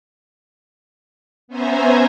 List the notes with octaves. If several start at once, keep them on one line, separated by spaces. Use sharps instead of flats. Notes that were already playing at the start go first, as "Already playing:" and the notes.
B3 C#4 C5 E5 G#5 A#5